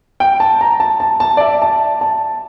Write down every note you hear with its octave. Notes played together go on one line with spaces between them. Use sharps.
G5
A5
A#5
A5
A5
A5
D5
E5
A5
A5